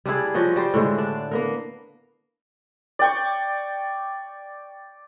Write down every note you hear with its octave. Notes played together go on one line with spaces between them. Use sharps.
G3 D4 E4 G#4
F3 F#4 C#5 D#5
G3 C5
A2 D3 G#3
D4
A#3 B3 A#4
D5 G5 C#6